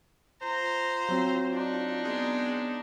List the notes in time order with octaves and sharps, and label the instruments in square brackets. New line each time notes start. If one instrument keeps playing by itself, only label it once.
[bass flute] F4 [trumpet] C5 [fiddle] A#5
[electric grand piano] F#3 C4
[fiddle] D4 D#4
[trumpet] G#3 [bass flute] B3